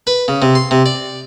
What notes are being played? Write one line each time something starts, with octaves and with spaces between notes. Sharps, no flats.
B4
C#3
C3
C6
C3
D5